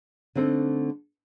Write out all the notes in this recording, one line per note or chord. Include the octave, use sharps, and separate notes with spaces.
D3 A3 C4 D#4 A4